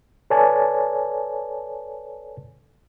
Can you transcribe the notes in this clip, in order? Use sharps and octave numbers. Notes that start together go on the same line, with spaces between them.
A4 B4 C#5 D5 G#5 A5